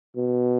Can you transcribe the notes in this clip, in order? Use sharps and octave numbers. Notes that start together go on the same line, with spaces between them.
B2